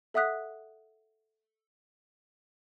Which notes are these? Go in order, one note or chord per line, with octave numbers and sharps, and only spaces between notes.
A4 E5 F#5 D#6 F#6 B6